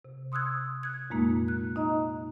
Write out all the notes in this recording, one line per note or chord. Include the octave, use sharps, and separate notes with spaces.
C3
C6 D#6 E6 F#6 G#6
F#6 G#6
F2 A#2 G#3 A#3 D#4
F#6
D#4 D#5 A#5